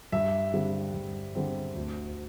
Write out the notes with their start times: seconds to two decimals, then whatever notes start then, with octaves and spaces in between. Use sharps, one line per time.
0.12 G2 E5
0.53 D3 G3 C4
0.94 G2
1.35 D3 G3 C4
1.75 D2